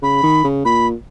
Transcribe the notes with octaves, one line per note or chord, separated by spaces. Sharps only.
C#3 B5
D#3
C#3
A#2 B5